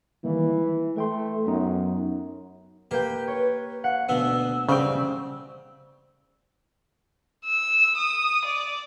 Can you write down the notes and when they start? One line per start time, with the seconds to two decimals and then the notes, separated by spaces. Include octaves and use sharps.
0.24 D#3 E3 G3 A#3
0.57 G#3
0.96 A3 B4 G5 C6
1.46 F#2 B3 D#4
2.91 A#3 G4 B4 G5
3.28 C#5
3.84 F5 F#5
4.09 D2 B2 B3 E6
4.69 C#3 G3 C4 G5
7.46 E6
7.97 D#6
8.45 D5